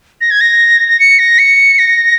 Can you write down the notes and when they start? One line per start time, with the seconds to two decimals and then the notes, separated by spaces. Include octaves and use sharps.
0.21 A#6
0.31 G#6
0.41 A#6
0.88 A#6
1.00 C#7
1.19 A#6
1.39 C#7
1.79 A#6